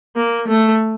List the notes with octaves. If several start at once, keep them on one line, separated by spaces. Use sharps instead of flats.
A#3
A3